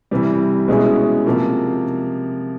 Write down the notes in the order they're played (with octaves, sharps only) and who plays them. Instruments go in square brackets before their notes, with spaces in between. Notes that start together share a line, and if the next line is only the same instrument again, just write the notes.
[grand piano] C3 E3 G3
B2 G#3 C#4 E4 G#4
C3 F3 A#3